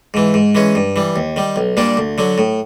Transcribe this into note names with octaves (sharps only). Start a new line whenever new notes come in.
G#2 E3
G#2
E3 G#3 C#4
G2
E3 G3
D#2
D#3 G3
B1
A#2 G3 A#3 D4
D2
D3 F#3
A2